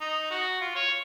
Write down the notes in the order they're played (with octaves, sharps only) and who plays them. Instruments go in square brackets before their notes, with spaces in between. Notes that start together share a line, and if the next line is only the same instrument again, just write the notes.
[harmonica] D#4
F#4
F4
C#5